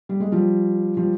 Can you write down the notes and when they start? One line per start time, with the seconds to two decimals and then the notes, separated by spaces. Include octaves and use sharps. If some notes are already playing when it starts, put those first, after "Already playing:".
0.09 G3
0.20 G#3
0.32 F3 G3
0.97 F3 G3